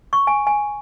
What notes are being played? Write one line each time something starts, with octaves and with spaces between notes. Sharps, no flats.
C#6
G#5
G#5